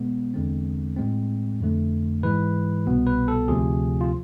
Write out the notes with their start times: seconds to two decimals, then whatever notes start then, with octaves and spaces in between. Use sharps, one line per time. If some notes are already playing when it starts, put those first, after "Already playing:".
Already playing: B2 G#3 B3
0.34 E2 D3 G#3 C4
0.96 A2 G#3 C4
1.61 F2 D3 A3
2.23 G#2 E3 G#3 B4
2.86 C2 B2 B3
3.06 B4
3.28 A4
3.48 D2 C3 F3 G#4
4.01 F4